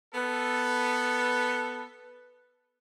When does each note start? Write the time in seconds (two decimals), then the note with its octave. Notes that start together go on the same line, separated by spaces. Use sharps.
0.14 B3 A4